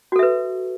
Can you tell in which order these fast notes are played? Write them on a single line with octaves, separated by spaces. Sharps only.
F#4 A4 E5 B4